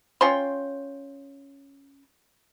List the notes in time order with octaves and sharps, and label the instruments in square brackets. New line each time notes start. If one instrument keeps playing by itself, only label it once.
[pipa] C#4 F4 G5 C6